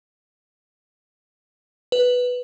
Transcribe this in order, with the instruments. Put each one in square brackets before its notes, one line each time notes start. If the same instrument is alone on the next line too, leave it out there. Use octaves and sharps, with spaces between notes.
[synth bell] B4